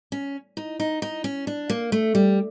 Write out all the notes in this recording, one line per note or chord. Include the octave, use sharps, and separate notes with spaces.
C#4
D#4
D#4
D#4
C#4
D4
A#3
A3
G3